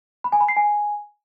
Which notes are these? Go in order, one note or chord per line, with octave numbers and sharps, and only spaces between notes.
B5
G#5
B5
C7
G#5